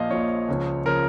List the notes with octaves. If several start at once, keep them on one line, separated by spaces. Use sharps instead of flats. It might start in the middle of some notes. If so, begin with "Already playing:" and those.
Already playing: A#1 A#2 F3 D#5 F5
A#1 A#2 F3 C#5
C#2 C#3 F3
C#3 F3 A#4